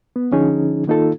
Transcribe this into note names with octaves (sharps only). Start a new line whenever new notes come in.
B3
D3 F3 C#4 D#4 G#4
D#3 A#3 D#4 F4 A4